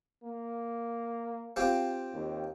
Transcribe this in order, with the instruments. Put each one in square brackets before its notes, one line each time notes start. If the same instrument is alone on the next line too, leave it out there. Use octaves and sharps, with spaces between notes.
[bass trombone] A#3
[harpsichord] C4 F4 G4
[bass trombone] D#2